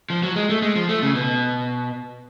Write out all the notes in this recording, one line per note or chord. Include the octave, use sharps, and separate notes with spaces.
F3
F#3
G#3
A3
G#3
F3
A3
C#3
B2